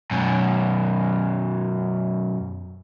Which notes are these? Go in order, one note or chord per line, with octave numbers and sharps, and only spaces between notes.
F#2 B2